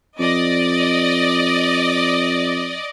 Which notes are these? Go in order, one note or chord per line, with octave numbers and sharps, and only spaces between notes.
F2 D5 D#5